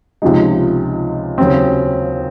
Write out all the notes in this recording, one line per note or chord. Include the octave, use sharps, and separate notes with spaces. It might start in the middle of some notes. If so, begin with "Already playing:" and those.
C#2 C3 F3 G#3 D#4
D#2 C#3 F#3 C4